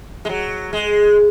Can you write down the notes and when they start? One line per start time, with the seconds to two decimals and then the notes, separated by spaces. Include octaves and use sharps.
0.25 G#3
0.29 F#3
0.73 G#3